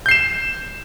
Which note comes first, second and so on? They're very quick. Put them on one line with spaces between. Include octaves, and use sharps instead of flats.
G6 C7 E7